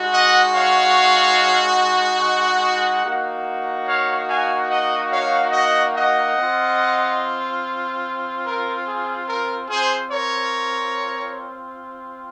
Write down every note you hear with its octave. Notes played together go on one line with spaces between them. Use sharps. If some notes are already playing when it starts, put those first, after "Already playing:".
Already playing: G#3 D#4 F#4
D#5 F#5
C#5 F5
D#5 F#5
A#3 D#4 F#4
C#5 F5
F5 G#5
D#5 F#5
C#5 F5
D#5 F#5
D#5 F#5
C4 F4
A#4
G#4
A#4
C4 F4 G#4 C5
A#4 C#5